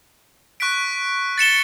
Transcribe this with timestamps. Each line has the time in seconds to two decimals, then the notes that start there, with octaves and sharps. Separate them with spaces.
0.60 C#6 F#6 B6 D7
1.38 A6 C#7 E7 G7